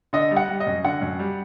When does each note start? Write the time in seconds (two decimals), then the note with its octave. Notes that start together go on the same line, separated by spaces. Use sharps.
0.13 D3 D#5
0.31 G3
0.36 F#5
0.48 G3
0.60 D#5
0.67 F#2
0.84 D3 F#5
1.02 F#2
1.19 G3